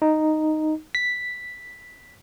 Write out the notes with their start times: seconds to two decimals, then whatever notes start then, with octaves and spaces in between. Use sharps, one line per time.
0.02 D#4
0.95 B6